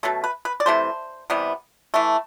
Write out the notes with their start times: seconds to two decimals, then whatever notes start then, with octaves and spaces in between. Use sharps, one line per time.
0.03 B2 F#3 A3 A4
0.24 B4
0.45 B4
0.60 D5
0.66 C3 E3 A3 C5
1.30 C3 E3 G3 B3
1.94 E3 A3